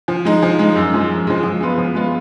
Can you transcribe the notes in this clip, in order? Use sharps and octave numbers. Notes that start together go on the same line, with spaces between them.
F3
G#3 D#4
F3
G#3 D#4
F#2
F3 G#3
F#2
F3 G#3
F3
G#3 B3 F4
F3
G#3 B3 F4